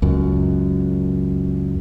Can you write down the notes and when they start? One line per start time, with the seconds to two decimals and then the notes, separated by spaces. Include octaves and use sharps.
0.02 C#2 F#2